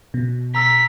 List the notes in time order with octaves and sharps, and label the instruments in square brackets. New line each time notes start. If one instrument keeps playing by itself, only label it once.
[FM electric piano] B2
[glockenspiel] A#5 E6 A#6 [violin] B6